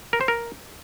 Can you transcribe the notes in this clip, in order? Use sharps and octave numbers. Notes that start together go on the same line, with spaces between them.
A#4
C5
A#4